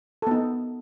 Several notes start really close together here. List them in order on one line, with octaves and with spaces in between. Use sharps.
A4 B3 D#4